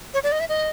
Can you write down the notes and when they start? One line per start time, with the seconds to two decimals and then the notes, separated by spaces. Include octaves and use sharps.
0.14 C#5
0.23 D5
0.32 D#5
0.40 E5
0.49 D#5